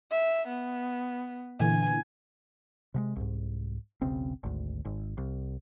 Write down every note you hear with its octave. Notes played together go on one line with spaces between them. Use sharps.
E5
B3
A#2 D3 E3 G#5
C3 G3 G#3
C2 G#2
E1 B1 C#3 C4
G#1 D2
G#1
C2